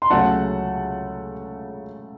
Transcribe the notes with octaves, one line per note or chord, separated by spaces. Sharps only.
C6
C#2 C#3 F#3 A3 C#4 F#5 A5